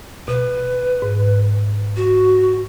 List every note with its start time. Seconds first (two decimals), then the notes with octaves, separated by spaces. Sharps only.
0.28 B2 B4
1.02 G#2
1.97 F#4